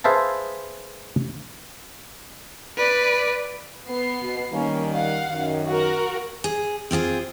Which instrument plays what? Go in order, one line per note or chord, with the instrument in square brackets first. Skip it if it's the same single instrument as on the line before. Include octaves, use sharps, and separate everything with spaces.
[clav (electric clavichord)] G#4 B4 C5 E5 F5 A5
[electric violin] B4 D5
[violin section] B3 C7
[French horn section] B2
[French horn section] D#3 G3 [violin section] A#3 C#4
[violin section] F5 F#5
[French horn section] F#2 D#3
[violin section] F#4 A#4
[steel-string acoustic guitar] G#4
C4 F4 G4 G#4